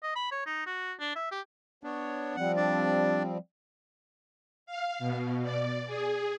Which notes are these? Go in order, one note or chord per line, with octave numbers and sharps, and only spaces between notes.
D#5
B5
C#5
D#4
F#4
D4
E5
G4
B3 D4 C#5
F3 G3 C4 F#5
D4 D5
F5
B2
D5
G#4